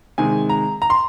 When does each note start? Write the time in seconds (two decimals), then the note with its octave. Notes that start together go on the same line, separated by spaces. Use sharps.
0.18 C3 D#3 G#3 G#5
0.49 A#5
0.82 A#5
0.90 C6